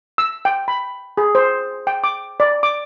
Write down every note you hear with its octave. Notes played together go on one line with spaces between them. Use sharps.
E6
G5
B5
G#4
C5
G5
D6
D5
D6